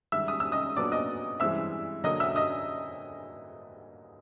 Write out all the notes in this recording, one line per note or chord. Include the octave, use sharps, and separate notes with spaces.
G#2 D#3 G3 E5 E6
D#6
E6
D#5 D#6
A#2 F#3 B3 D4 D5 D6
D#5 D#6
G2 E3 G#3 C4 E5 E6
D3 F#3 A#3 D#5 D#6
E5 E6
D#5 D#6